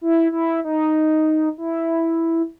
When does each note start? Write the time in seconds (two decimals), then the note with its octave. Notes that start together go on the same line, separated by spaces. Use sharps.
0.01 E4
0.32 E4
0.64 D#4
1.58 E4